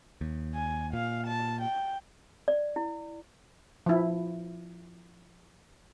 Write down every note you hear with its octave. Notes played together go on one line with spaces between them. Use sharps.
D#2
G#5
A#2 F5
A5
G5
D5
E4
F3 E4